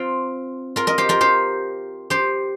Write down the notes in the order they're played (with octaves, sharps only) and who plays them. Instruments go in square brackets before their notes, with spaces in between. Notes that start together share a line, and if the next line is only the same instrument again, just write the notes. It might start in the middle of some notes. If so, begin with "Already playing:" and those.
Already playing: [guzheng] C4 F4
F4 A#4
A#4 D#5
G4 C5
F4 A#4
G4 C5
G4 C5